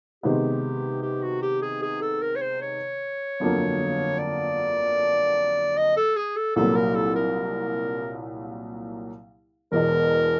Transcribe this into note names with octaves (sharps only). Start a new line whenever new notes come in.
C3 D#3 G#3 B3 G4
G4
F#4
G4
G#4
G#4
A4
A#4
C#5
C5
C#5
G1 F2 D3 F#3 A#3
D5
D#5
A4
G#4
A4
C2 A#2 F#3 A#3 A4
A#4
A4
A#4
E1 E2 B2 A#4